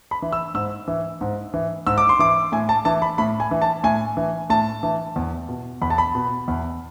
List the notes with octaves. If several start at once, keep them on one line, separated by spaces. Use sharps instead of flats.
B5
E3
E6
G#2 E6
E3
G#2
E3
G#2 E6
D6
C6
E3 D6
A2 G#5
A5
E3 A5
B5
A2 B5
G#5
E3
A5
A2 G#5
E3
A2 A5
E3
E2
B2
E2 B5
A5
B5
B2
E2